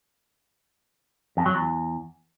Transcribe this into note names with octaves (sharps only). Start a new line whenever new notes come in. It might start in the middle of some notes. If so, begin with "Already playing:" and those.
F2
F#3
E2